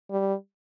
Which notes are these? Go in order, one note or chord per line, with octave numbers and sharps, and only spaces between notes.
G3